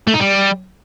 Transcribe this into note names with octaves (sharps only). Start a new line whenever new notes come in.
A3
D#4
G3